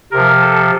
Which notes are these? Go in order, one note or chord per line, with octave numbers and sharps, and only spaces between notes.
C3 F3 A#4
A4